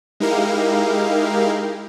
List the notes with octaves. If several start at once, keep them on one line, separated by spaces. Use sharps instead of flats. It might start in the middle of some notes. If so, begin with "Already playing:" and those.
G#3 D#4 E4 G4 A#4 F5